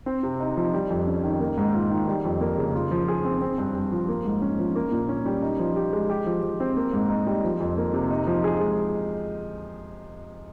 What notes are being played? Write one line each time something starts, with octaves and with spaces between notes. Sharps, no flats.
C4
C3
D#4
F3
G3
F2
C#4
D#3
A#3
G#2
F4
D#3
G3
F2
A#3
C#3
F4
F3
G#4
C4
C4
G2
G2
F3
A#3
G#2
C#4
F3
A#3
A#2
C#4
G3
D#4
F3
G4
G#3
G4
F3
F3
C4
A#3
G#2
D#4
G3
F3
F2
A#3
C3
D#4
F3
G#4
G#3